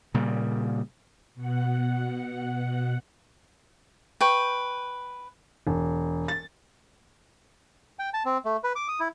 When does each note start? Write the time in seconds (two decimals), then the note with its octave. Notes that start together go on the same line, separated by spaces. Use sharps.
0.14 A#2 C#3 G3
1.35 B2 F#5
4.21 B4 G5 C#6
5.67 E1
6.28 A6
7.99 G5
8.14 A5
8.25 C4
8.45 A3
8.64 B4
8.76 D6
8.88 D#6
9.00 E4